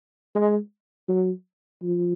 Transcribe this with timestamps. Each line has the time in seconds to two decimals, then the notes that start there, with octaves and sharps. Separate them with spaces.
0.35 G#3
1.08 F#3
1.82 F3